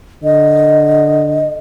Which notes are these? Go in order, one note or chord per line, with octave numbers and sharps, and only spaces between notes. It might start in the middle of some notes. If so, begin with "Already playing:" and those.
D3 D#5